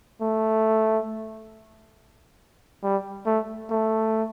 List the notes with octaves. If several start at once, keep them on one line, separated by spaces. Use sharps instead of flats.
A3
G3
A3
A3